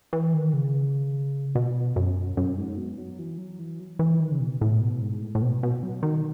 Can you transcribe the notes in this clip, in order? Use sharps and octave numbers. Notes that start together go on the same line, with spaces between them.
E3
D#3
C#3
B2
F#2
F#2
G#2
B2
F#3
E3
F#3
E3
F#3
E3
D#3
C#3
B2
A2
B2
G#2
A2
A2
B2
B2
F#3
D#3